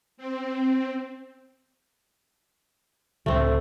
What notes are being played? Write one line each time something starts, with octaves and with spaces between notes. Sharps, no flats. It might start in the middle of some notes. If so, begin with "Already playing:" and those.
C4
C#2 A2 D3 A3 C4